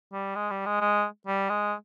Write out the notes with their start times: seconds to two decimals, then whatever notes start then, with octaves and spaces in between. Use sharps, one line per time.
0.13 G3
0.35 G#3
0.50 G3
0.66 G#3
0.81 G#3
1.27 G3
1.49 G#3